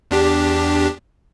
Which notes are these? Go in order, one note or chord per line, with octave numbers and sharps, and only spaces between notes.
E2 D4 G4